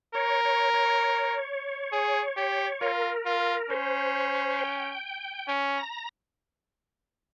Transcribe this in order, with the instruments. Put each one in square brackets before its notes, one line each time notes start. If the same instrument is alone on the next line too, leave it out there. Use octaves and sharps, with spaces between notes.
[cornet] A#4 [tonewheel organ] C#5
[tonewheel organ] C#5
C#5
[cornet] G#4
G4
[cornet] F4 [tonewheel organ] A#4
[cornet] F4
[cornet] C#4 [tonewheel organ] C5
[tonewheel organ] G5
[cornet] C#4
[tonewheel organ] A#5